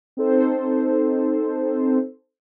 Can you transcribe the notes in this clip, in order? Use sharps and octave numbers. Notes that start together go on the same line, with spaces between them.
C4 D#4 A4 C5